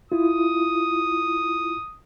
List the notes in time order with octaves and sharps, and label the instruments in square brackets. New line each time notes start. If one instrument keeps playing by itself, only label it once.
[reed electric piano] E4 F4 [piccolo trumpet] D#6